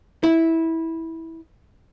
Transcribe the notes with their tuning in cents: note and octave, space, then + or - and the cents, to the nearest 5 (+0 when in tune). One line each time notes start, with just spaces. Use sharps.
E4 -15